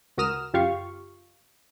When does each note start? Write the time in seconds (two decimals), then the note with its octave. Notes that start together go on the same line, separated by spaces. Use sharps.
0.17 C#2 F#4 A#4 D#6 F6 E7
0.53 F#2 C#3 F4 G4 F5 C#6